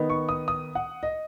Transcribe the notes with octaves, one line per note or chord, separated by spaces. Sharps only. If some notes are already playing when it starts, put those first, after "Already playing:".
Already playing: D#3 B3 D#4
C#6
D#6
D#6
F#5
D#5